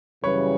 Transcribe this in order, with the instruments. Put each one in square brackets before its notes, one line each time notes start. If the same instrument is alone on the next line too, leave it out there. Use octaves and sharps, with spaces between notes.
[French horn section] F#2 C#3 E3 G3 [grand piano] B4 C#5